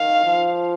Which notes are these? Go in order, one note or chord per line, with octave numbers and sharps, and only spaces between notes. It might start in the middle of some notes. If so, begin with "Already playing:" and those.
Already playing: D#3 F5
F3